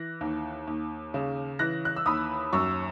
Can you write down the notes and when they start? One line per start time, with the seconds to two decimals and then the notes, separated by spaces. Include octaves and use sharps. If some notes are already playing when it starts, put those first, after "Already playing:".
Already playing: E3 F#6 A#6
0.21 D#2
0.67 D#2
1.14 C#3
1.59 E3 F#6 A#6
1.85 F#6
1.96 E6
2.06 D#2 B5 D#6
2.53 F#2 C#6 E6